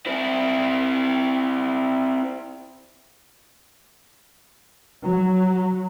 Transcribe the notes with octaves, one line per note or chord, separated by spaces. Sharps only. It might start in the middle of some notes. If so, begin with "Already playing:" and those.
C4 E4
F#3